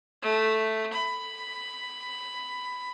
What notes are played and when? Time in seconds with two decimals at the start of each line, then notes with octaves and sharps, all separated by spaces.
0.23 A3
0.93 B5